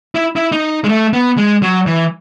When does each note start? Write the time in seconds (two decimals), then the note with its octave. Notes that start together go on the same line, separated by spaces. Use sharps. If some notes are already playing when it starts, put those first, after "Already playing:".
0.15 E4
0.36 E4
0.52 D#4
0.84 G#3
0.89 A3
1.13 B3
1.37 G#3
1.62 F#3
1.86 E3